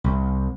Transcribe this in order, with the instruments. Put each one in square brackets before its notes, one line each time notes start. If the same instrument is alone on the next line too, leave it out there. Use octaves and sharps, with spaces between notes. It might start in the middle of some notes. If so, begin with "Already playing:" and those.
[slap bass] C2